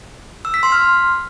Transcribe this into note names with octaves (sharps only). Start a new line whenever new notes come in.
E6
B6
C6
F6